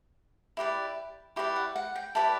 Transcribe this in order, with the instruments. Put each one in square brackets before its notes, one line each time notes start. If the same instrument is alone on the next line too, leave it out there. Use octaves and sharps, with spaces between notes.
[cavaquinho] E4 G4 B4 D5
E4 G4 B4 D5 C#6
F#5
F#5
G5
E4 G4 B4 D5 A5